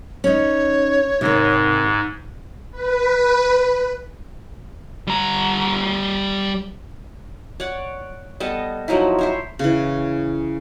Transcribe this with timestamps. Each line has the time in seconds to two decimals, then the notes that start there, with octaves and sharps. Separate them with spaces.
0.24 C#4 D#4 C#5
1.21 G#2 C3 D#3
2.72 B4
5.07 G3 A#5
7.60 C#5 D5 F#5
8.40 G3 B3 A4 D#5
8.88 F3 F#3 D#4 E4
9.19 E4 C5 C#5
9.59 C#3 E3